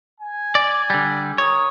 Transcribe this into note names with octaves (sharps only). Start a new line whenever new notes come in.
G#5
D5
D3 G3
A#4 C#5 D#6